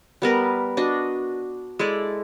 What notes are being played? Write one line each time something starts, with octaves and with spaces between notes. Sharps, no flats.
G3 B3 A#4 B4
D4 F#4 D#5
G#3 E4 A4 D5